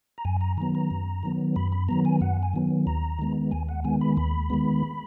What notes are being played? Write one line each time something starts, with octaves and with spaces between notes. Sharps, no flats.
A#5
F#2 G#5
A#5
D#3 F#3 B3 A#5
A#5
F#2
D#3 F#3 B3
F#2 B5
B5
D#3 F#3 B3 A#5
G#5
F#2 F#5
G#5
D#3 F#3 B3
D#2 A#5
D#3 G#3 B3
D#2 G#5
F#5
D#3 G#3 B3 G#5
B5
D#2 B5
D#3 G#3 B3